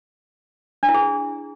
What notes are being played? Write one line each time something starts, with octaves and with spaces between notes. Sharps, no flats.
D4
E4
G#4